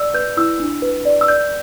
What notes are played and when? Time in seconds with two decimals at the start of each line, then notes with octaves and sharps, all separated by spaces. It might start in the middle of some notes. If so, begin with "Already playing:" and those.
Already playing: D5 E6
0.14 B4 G6
0.37 E4 E6
0.60 D4
0.82 B4
1.05 D5
1.21 E6
1.28 D5 G6